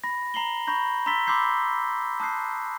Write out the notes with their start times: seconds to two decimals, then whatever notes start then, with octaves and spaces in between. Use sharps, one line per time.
0.04 B5 A#6
0.34 A#5 C7 F#7 G7
0.67 A#5 B5 C#6 G6 A#6
1.06 A#5 C6 E6 A6 B6 G7
1.27 B5 C6 D6 E6 G6 C7
2.20 A5 D#6 F#6 G6 C7